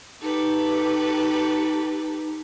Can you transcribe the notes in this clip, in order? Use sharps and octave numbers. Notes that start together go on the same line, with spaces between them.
D#4 G4 A4 B4